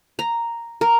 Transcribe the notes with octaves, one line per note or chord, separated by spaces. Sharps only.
A#5
A#4